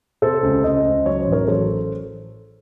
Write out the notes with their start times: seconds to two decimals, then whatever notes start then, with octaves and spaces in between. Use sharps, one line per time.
0.22 C3 A4 C5
0.43 C#2
0.63 C#2 C5 D#5
0.85 C#2
1.06 F#3 C#5
1.19 C5
1.27 A1
1.32 A#4 C#5
1.47 F#3 A4 C5